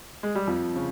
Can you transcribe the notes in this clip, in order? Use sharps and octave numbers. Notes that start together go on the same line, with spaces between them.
G#3
G3
F2 F3
C#3